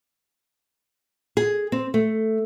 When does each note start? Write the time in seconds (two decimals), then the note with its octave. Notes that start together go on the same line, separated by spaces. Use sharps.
1.37 G#4
1.72 C4
1.94 A3